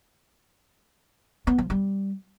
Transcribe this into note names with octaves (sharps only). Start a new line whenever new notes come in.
B3
F3
G3